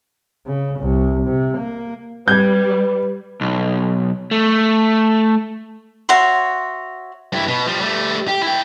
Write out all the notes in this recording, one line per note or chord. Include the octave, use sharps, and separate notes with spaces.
C#3
C2
C3
A#3
G3 B4 G6 G#6
B1
A3
F#4 C#5 E5 C6
G2 E4
B2
F3 G3
G3 A3
G4
E4 G5